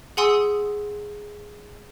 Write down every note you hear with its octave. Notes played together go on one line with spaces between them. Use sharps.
G#4 F#5 G#5 C6 D#6 E6